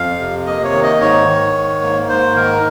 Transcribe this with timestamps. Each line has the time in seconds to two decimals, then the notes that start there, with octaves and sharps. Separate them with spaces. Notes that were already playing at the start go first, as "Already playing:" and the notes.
Already playing: F2 F5
0.20 C3
0.46 A#3 D#5
0.64 C#5
0.73 D#3
0.83 D#5
1.01 G#2 C#5
1.28 D#3
1.55 G#2
1.82 A#3
2.09 G#2 C5
2.35 D#3 A#4